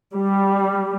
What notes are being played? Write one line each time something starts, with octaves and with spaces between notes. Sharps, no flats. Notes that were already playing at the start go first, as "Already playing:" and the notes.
G3